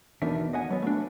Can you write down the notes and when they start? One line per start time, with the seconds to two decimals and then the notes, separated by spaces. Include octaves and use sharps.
0.22 E2 B2 D#3 D4 E5
0.53 D#5 F#5 G#5
0.70 F#3 B3
0.82 A3 D4